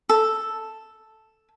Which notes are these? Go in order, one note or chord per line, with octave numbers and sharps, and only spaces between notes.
A4